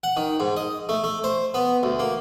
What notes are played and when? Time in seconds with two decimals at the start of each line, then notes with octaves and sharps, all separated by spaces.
0.03 F#5
0.17 D#3
0.40 G#2
0.57 D#5
0.89 A3
1.04 A3
1.24 C5
1.54 B3
1.83 D2
1.99 A#3